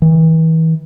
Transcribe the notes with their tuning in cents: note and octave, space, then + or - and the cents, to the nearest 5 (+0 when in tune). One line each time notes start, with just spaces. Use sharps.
E3 -35